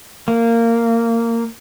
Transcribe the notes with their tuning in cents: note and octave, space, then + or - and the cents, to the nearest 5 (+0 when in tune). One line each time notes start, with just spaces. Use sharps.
A#3 -15